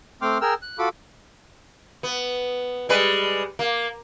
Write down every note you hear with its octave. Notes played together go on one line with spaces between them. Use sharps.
A3 C4 G5 C6 D6 F6
G#4 A#4 G5 E6 F6
F#6
F4 F#4 A4 B5 D6
B3
G3 G#3 B4
A#3